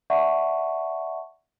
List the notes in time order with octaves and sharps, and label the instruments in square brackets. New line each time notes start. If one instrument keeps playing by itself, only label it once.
[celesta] D5 E5 F#5 A5 B5 C#6